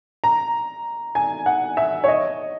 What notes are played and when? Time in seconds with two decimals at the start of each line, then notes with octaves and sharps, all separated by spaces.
0.24 A#5
1.15 G#5
1.46 F#5
1.77 E5
2.04 C#5
2.08 D#5